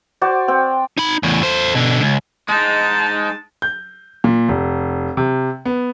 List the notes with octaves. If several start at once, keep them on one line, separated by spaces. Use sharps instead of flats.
F#4 C5 D5
C4 G5
D#4 B5
E2 A2
A4 C5
B2 D3
C#2
G#3 D#4 A5
G6
A#2
F1
C3
B3